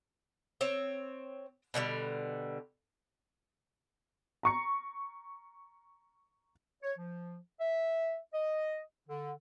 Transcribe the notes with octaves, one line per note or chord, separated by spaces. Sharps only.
C4 C#5
B2 D3 F#3 G3
A#5 C#6 C#7
C#5
F3
E5
D#5
D3